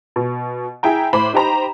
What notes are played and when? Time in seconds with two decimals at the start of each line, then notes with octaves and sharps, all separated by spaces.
0.16 B2
0.83 E4 G#4 G5 A#5
1.13 A2 C5 B5 D6
1.33 D#4 G4 C5 A#5 B5